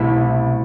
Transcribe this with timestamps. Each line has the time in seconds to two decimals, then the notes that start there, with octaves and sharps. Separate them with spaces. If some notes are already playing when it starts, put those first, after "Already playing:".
Already playing: C2 B2 A3 E4 B4